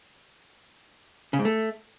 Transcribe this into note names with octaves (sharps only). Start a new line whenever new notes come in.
C#3
G#2
A3